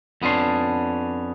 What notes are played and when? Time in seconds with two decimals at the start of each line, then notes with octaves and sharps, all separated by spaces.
0.22 F2 B3 C#4 D4 C6